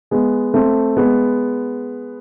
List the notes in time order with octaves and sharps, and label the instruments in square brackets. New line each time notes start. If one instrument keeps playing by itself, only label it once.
[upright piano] G#3 B3
A3 C4
G#3 B3